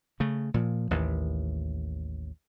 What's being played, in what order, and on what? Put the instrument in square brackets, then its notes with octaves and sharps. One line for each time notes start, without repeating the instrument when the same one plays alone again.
[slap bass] C#3 A3
A#2 F3
A1 D#2